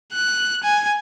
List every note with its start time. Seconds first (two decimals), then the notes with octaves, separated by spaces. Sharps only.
0.13 F#6
0.63 G#5